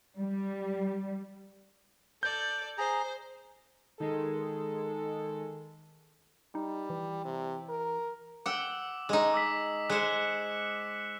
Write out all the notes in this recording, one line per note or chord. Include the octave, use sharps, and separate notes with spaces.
G3
A4 D5 G6
G#4 C5 A#5
D#3 G#3 A4
G3 D#4
E3
C3
A#4
F#5 G5 D6 E6
G#3 D#4
D6 E6 B6
G#3 C5 F#6 C#7 E7